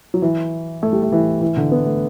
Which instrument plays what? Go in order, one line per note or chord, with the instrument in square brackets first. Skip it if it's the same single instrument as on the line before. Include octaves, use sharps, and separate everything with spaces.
[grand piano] F#3
E3
A3
G3
A3
E3
E3
D3
B3
A3